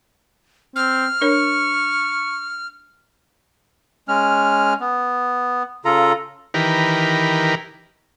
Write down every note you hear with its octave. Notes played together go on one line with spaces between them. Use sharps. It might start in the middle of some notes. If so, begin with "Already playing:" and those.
C4 F6
D4 A#4 C#5 C#6
G#3 C#4 F6
B3
C#3 F4 A4 A#5
D#3 E3 G4 A#4 B4